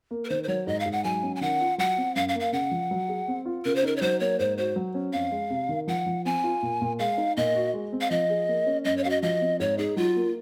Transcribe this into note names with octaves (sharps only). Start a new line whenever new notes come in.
A#3
A#4
D#3 C5
C5
F#3 C#5
G#2 D#5
F5
G#2
F#5
F#3 G#5
C#4
G#5
D#3 F#5
F4
F#3 F#5
C4
F#2 F5
F5
A#3
F5
C#3 F#5
F3
F#3
G#4
C4
F4
C#3 A#4
C5
D#4 A#4
C#5
F#3 C5
A#3 C#5
G#2 C5
F#4 C5
F#3
C#4
F2 F5
G#3
C3
D#3
F3 F#5
F3
C4 G#5
F4
A#2
A#2
G#3 F5
D#4
A#2 D#5
F#4
G#3
C4
F5
F3 D#5
G#4
A#3
C#4
F#2 D#5
C#5
F#4 F5
D#5
F3 D#5
C4
G#2 C#5
D#4 G#4
F#3 F4
A#3